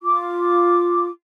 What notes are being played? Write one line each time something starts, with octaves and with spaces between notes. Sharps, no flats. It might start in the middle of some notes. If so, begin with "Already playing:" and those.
F4 D6